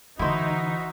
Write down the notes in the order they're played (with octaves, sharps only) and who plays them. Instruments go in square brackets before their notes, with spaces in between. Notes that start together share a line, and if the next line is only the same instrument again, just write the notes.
[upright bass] D3 E3 [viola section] D#4 [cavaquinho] E4 C5 [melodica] F#4 E5